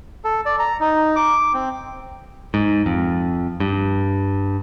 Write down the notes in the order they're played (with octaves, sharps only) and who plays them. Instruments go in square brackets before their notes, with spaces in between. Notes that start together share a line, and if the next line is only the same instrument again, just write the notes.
[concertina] A4
D5
A#5
D#4
D6
C4
[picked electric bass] G#2
F2
G2